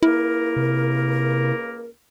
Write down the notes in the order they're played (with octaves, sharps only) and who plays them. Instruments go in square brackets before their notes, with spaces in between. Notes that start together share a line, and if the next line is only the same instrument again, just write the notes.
[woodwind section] C#2 A#3 A#4 [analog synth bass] E4
[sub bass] C3